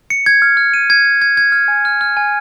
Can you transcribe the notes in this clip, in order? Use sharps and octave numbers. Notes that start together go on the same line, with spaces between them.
C#7
G#6
F6
F6
D#7
G#6
C#7
G#6
G#6
F6
G#5
F6
F6
G#5